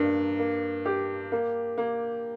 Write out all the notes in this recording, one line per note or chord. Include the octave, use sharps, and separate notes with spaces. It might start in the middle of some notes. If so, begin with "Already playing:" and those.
Already playing: G2 A#3
A#3
G4
A#3
A#3